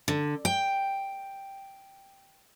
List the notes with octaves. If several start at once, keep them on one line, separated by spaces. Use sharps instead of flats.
D3
G5